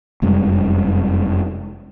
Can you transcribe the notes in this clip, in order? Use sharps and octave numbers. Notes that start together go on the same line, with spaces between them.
F1 F#2 G3 G#3